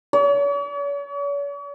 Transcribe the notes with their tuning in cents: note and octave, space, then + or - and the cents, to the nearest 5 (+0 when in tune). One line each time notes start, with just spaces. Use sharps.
C#5 +45